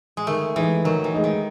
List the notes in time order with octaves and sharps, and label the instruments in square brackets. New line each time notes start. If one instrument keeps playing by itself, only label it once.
[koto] G#3
[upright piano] D#3 [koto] A3
[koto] E3 [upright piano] G#3 D#4
[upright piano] D#3 [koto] F#3
[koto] E3
[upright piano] G#3 D#4
[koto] D#3